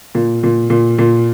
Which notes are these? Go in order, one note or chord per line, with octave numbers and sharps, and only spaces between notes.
A#2
A#2
A#2
A#2